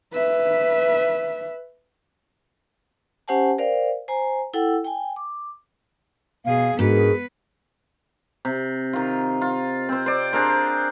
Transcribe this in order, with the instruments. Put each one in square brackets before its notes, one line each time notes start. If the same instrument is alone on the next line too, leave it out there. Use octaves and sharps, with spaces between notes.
[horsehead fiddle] B4 E5
[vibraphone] C#4 G4 C5 F#5 G#5 A5
A#4 C5 D5 F5 G5
C5 G#5 A#5
E4 A4 F#5 G5 E6
G5 G#5
D6
[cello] B2 G#4 [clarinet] F5
[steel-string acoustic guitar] G#2 [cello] B3 B4 [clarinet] D4 [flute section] F#4 G#4 A#4
[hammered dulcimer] C3
D#3 F4
F4
C4 C5
C5 D5
D4 G#4 A#4 C5